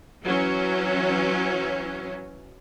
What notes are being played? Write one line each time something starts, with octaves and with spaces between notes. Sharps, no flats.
E3 F#3 C#4